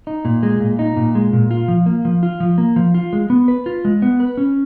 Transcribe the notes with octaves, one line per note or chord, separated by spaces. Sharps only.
D#4
A#2
G#3
A#2
D#4
A#2
G#3
A#2
F4
F3
A#3
F3
F4
F3
A#3
F3
F4
G#3
B3
B4
F4
G#3
B3
B4
C#4